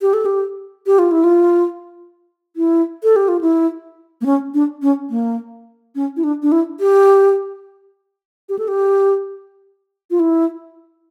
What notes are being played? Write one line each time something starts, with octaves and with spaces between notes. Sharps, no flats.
G4
A4
G4
G4
F4
E4
F4
E4
A4
G4
F4
E4
A#3
C#4
D4
C#4
A#3
C#4
E4
D4
D4
E4
G4
G4
A4
G4
F4
E4